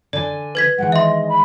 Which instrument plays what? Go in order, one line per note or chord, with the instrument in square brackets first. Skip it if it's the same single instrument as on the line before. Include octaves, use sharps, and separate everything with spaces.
[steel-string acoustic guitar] D3 D4 G#5 [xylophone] D5
[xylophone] B4 G#6 B6
[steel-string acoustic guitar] D#3 E3 G#3 [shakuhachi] F#5
[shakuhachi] D#5 [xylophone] E5 C6
[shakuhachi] B5